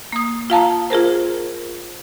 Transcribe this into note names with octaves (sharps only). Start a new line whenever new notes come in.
A#3 D#6
F4 F5 A5 A#5
F4 G#4 A#4 C5